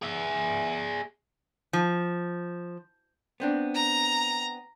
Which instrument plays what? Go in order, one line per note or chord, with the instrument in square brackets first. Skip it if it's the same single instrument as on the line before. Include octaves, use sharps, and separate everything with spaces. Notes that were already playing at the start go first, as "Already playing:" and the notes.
[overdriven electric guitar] G#4 E5
[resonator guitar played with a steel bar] F3
[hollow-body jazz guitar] B3 C4 D4
[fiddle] A#5